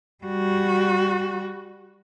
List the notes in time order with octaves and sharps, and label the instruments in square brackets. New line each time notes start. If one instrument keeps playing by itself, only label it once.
[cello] G3 F#4